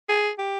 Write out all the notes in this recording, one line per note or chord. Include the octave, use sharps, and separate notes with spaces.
G#4
G4